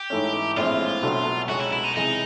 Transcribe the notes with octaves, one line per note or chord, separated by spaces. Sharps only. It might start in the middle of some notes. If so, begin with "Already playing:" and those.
Already playing: G4
G#2 E3 A3 C#4
A#1 A2 E3 G#3 C4 F4
C2 B2 F#3 A3 D4
C2 B2 G#3 C#4 F#4
E4
E4
D#4
C3 E3 G#3 D#4